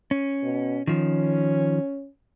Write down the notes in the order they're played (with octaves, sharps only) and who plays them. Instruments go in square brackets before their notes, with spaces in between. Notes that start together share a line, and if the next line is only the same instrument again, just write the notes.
[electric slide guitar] C#4
[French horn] B2
[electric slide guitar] D#3 F3 [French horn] C#4